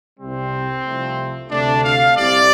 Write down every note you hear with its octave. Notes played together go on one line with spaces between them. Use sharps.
C2 C3 G3 C4
C2 C3 F3 A3
D2 C3 A3 D4
F5
C2 C3 G3 D5